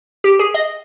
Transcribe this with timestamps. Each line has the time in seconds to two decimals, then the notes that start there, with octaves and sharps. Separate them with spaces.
0.24 G4
0.39 G#4
0.54 D#5